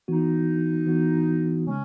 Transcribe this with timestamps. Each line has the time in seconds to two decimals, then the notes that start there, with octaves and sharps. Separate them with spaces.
0.08 E3 B3 D#4 F#4
0.86 E3 B3 F#4
1.64 C#3 G#3 C#4